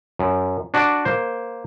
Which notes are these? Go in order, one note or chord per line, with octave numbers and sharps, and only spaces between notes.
F#2
D4 F#4 D5 F#5
A#3 C5